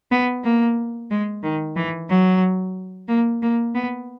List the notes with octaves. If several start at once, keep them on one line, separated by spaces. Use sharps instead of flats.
B3
A#3
G#3
D#3
E3
F#3
A#3
A#3
B3